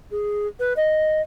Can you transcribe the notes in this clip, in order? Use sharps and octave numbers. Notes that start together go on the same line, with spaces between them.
G#4
B4
D#5